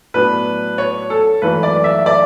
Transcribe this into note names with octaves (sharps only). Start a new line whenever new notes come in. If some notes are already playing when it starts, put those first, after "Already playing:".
A2 F#3 B3 D4 B4
C#5
A4
G#1 F#2 E3 A3 B4
D5
E5
D5